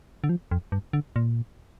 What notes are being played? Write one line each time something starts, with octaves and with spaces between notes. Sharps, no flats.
D3
F3
F2
G2
D3
A#2